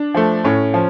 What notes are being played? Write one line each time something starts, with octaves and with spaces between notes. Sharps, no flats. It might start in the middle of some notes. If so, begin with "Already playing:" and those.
Already playing: D4
F3 A3
A2 C#4
F3